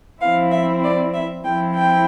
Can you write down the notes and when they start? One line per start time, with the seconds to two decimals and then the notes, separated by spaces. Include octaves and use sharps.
0.21 F3 C4 E4 F5
0.51 E5
0.83 D5
1.14 E5
1.44 F3 C4 E4 G5
1.75 G5